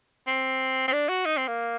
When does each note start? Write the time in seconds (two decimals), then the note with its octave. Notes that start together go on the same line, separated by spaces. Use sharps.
0.27 C4
0.88 C4
0.93 D4
1.09 F#4
1.26 D#4
1.37 C4
1.48 A#3